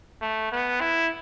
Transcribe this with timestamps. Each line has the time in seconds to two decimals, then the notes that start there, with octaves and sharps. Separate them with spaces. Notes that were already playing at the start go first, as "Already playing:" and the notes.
0.21 A3
0.52 B3
0.81 E4